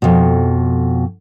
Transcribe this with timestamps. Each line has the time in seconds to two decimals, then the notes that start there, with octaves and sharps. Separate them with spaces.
0.02 F2 B2